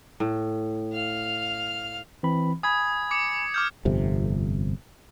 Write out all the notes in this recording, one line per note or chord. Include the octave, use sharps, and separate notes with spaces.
A2
F5 F6
E3 C4 B5
G#5 B5 D#6 G#6
D6 C#7
D6 F6 G6
G1 F2 C3